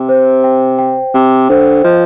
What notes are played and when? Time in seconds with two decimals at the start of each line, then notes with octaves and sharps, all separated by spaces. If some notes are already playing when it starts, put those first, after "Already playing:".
Already playing: C3 G5
0.09 C5
0.44 G5
0.79 G5
1.14 C3 G5
1.49 D3 C5
1.84 F3 D#5